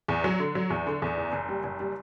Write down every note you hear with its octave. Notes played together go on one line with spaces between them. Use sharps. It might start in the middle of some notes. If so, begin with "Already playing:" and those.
E2
F#3
D3
F#3
E2
D3
E2
F#1
F#1
G3
F#1
G3